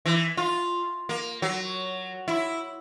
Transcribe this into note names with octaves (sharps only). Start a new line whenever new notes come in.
E3
F4
A#3
F#3
E4